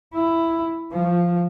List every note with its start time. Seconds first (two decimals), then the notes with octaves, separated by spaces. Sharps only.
0.14 E4
0.91 F3